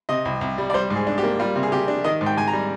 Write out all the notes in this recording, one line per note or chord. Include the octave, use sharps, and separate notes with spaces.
C3 D#5
C2
C2
G3
D5
G3 C5
G#2
G#4
D4
G4
A#3
G3 F4
C3
G#4
C3 G4
D4
D#3 D#5
G#2
G5
G#2 G#5
A#5
G3